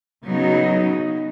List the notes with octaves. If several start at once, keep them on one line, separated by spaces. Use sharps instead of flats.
C#3 F#3 B3 D#4